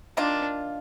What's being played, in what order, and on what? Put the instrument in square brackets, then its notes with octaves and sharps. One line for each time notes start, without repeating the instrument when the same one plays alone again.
[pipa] D#3 A#3 F4 [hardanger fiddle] D4